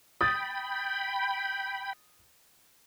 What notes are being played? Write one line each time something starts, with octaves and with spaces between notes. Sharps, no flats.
G5 B5 D#6 A6